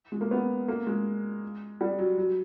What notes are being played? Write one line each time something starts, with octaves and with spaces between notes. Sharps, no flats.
G#3
A#3
B3
A#3
G#3
G3
F#3
F#3